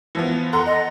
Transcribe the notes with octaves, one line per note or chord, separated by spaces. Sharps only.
E3 F3 B3
A4 F#5 A#5 C6
D#5